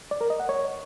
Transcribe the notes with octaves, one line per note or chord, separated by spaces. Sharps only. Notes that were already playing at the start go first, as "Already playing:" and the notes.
D5
A#4
D#5
F#5
C#5